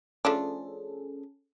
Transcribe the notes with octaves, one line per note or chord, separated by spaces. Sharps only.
F3 A3 C#4 D4 G#4 A4